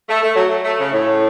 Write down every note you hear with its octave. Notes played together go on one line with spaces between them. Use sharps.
A3
A3
F#3
A3
C#3
A2